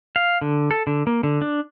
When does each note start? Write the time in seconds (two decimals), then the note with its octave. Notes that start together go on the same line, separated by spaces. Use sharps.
0.16 F5
0.41 D3
0.71 A4
0.87 D3
1.07 A#3
1.23 D3
1.42 D4